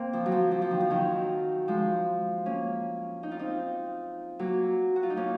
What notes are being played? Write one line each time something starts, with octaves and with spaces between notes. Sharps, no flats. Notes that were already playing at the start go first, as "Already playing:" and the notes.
Already playing: A#3 C4
F3
F#3
F3
F3
F3
D#3
F3
D#3 F#3
F3 G#3
A#3 C#4
D#4
F4
C4 D#4
F#3 A#3
F#4
F4
D#4
A#3 C#4